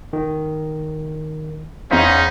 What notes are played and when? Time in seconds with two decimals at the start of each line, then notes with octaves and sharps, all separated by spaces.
0.13 D#3
1.91 E2 C#4 D#4 C5 F5 B6